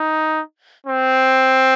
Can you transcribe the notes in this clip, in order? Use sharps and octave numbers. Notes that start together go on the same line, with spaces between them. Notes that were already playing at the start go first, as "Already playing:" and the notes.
Already playing: D#4
C4